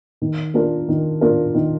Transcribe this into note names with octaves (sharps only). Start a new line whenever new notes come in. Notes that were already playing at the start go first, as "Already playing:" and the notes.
D#3
A#3 D4 F4 A#4
D#3
A#3 D4 F4 A#4
D#3